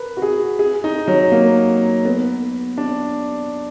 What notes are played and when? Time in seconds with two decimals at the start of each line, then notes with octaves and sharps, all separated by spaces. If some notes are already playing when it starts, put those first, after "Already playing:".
Already playing: A#4 B4
0.17 F#4
0.22 G#4
0.59 G#4
0.84 D#4
1.08 F#3
1.32 A#3
2.05 B3
2.78 D4